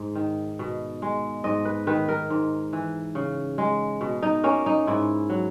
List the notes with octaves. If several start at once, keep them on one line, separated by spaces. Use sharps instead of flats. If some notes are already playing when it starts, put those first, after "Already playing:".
Already playing: G#2
D#3
B2
G#3
G#2 D#5
B4
D#3 B4
A#4
G#2
E3
C#3
G#3
B2
D#4
A#3 C#4
D#4
G#2 E4
F#3